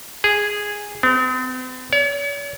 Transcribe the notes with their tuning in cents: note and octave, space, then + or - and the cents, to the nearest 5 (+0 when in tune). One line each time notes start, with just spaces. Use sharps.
G#4 -10
C4 -45
C#5 +45